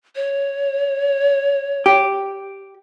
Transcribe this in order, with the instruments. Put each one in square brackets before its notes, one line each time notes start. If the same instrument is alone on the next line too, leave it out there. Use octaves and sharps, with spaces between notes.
[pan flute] C#5
[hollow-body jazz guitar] G4